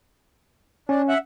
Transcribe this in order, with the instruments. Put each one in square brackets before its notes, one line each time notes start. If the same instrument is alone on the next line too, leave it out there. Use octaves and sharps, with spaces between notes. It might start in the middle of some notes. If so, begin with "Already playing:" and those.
[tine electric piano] C#4 [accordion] D4
[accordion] E5 F#5